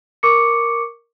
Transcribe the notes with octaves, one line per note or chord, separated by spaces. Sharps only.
A#4 C#6 D6 C#7